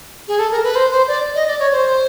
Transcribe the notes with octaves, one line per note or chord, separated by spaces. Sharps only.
G#4
A4
A#4
B4
C5
C5
D5
D#5
D5
C#5
C5